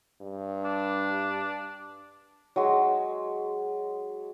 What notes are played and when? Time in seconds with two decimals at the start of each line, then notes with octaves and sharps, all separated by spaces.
0.21 G2
0.64 D4
2.56 F#3 G#3